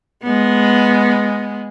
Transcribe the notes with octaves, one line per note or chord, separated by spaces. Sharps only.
G#3 B3